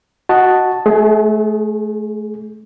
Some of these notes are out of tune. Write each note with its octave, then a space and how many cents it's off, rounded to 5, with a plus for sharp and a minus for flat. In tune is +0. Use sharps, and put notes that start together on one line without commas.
F#4 +0 D#5 +0 A5 +0
A3 -30 G#4 +10